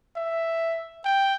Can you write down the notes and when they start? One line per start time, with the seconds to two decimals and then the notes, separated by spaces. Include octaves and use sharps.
0.16 E5
1.05 G5